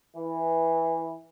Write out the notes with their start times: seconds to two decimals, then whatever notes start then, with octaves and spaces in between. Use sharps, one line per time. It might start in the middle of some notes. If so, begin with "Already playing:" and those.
0.16 E3